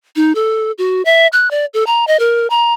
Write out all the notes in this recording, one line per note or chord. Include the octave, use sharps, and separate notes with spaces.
D#4
A4
F#4
E5
F#6
D5
A4
A#5
D#5
A#4
A#5